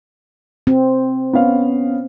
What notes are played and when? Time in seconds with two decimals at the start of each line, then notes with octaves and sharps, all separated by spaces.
0.67 C4
1.33 B3 C#4 F5